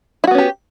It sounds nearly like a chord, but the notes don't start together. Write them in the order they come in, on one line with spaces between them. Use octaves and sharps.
E4 F#4 B3 C#4 G4